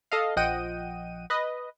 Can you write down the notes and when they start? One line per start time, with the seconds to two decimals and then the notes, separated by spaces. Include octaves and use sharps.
0.12 A4 D#5 F5
0.36 A#1 F3 D#5 F#5 G5 D#7
1.30 B4 D#5